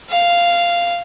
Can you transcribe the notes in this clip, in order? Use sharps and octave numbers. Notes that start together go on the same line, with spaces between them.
F5